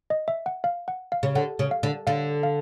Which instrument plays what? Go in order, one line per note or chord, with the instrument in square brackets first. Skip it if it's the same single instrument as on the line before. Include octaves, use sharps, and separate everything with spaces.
[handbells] D#5
E5
F#5
F5
F#5
F5
[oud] C#3
[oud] D3 [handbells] F#5
[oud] C#3
[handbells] F5
[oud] D3
[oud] D3 [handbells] F5
[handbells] F5